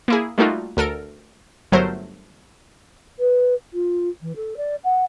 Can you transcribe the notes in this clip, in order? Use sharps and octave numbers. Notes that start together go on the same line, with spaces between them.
A#3 E4 G#4
G3 A3 A#3 D#4 F4 F#4
D2 A4 A#4 D7
G1 F#3 A3 A#4 C5
B4
F4
E3
A4
D5
F#5